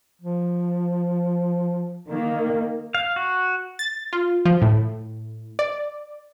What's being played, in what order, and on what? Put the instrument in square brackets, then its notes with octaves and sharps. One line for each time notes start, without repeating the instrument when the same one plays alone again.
[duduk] F3
[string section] D#3 A#3
[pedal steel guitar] F5
F#4
[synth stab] A6
F4
F3
A2
D5